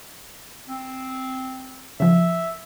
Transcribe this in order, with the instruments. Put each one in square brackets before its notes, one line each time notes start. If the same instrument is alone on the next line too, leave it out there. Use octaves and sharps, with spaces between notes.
[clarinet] C4
[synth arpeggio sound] C#3 F3 [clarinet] E5